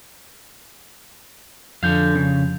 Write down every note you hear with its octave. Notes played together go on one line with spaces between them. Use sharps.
F2 D3 F3 F5 G6
C#3